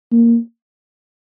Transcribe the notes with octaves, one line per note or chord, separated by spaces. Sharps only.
A#3